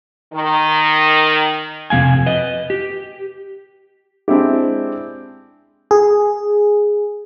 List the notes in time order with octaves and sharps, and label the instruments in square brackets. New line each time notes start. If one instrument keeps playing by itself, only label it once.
[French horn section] D#3
[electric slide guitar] F2 C3 G#3 F5 G#5
B4 D#5
G4
[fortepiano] G#3 C4 D4 E4 G4
[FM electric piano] G#4